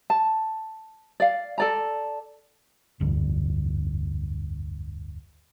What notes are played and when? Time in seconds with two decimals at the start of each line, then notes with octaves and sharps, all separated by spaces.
0.10 A5
1.20 D5 F5
1.58 A4 D5 A#5
3.00 F1 D2 G2